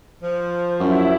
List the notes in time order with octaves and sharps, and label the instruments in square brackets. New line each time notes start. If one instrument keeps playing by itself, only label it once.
[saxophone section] F3 [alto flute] C5
[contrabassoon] F#2 [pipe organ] E4